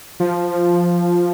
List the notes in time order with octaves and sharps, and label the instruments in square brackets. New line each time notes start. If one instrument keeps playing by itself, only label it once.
[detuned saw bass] F3